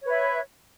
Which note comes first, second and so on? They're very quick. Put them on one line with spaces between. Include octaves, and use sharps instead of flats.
C#5 B4 E5